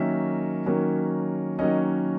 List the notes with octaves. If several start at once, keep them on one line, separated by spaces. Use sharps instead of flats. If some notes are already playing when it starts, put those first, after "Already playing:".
Already playing: D#3 F#3 A#3 C#4 E5
D#3 F#3 A#3 C#4
D#3 F#3 A#3 C#4 D#5